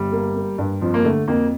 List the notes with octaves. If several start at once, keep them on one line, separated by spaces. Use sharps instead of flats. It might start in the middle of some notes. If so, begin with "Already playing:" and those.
Already playing: G1 G3
A#3
A#3
G2
F2 F3
A#3
D3 A3
F2 A#3